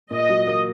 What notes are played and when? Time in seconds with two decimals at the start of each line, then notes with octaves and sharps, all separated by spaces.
0.11 A#2 D#5
0.30 F#3
0.47 A#3